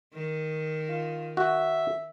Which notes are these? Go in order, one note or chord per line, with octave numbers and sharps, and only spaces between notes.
D#3
F4
F#4 E5